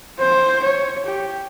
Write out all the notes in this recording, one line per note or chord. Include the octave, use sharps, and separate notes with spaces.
C5
C#5
G4